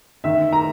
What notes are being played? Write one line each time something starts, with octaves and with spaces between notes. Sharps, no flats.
D#3 E5
A#5